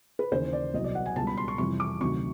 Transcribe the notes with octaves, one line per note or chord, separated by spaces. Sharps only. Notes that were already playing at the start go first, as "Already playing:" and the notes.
B4
D#2 C#3 E3 C5
D5
C2 B2 F#3 D#5
D5
F#5
G#5
C#2 B2 G3 A5
B5
C6
C#6
F2 C3 E3 G3 C#6
D6
D2 C3 D#3 F#3 C#6